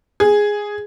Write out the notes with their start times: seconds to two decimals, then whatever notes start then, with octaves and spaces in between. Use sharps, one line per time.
0.20 G#4